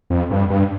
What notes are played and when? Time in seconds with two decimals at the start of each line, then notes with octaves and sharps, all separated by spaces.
0.10 F2
0.31 G2
0.50 G2